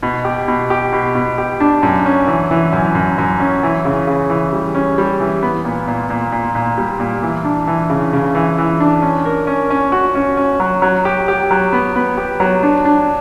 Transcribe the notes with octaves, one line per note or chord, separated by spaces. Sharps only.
B2
G4
B2
G4
B2
B2
G4
D4
F#2
C#4
E3
E3
F#2
F#2
F#2
C#4
E3
C#3
C#3
E3
G3
C#4
G3
E3
B3
A#2
A#2
A#2
A#2
A#2
G3
A#2
E3
D4
E3
C#3
C#3
E3
E3
D4
C#4
A#4
C#4
C#4
F#4
C#4
C#4
F#3
F#3
G4
G4
F#3
B3
B3
G4
F#3
D4
D4